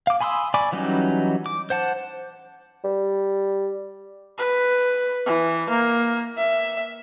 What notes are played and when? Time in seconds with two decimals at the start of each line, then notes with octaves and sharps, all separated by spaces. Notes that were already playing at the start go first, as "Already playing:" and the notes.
0.07 F5 D6
0.21 G#5 B5 C6 D#6 E6
0.54 D5 G#5 B5 C#6 D6
0.72 E3 F#3 G3 C#4 D#4
1.46 D6
1.70 C5 F#5 A5
2.84 G3
4.38 B4
5.26 E3
5.70 A#3
6.38 E5